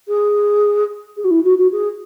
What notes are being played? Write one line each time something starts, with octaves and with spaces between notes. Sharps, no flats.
G#4
G#4
F#4
E4
F#4
F#4
G#4